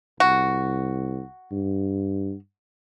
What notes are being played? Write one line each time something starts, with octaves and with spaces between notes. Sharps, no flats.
C2 F#4
G2